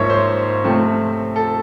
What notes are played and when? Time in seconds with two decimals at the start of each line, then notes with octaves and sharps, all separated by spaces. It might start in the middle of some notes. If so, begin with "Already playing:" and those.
Already playing: G#2 F3 A#3 C#5 E5
0.10 C5
0.64 C3 F3 A3 C4
1.36 A4